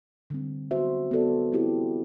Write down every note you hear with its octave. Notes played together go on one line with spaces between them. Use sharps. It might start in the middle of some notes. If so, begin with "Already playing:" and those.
D3 G3 C4
B3 F#4 C5 E5
B3 F#4 A4 D5
C4 E4 G4